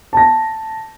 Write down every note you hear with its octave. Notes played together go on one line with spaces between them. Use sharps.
A5 A#6